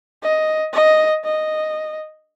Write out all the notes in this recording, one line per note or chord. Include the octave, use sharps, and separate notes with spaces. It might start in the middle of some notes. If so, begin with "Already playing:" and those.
D#5
D#5
D#5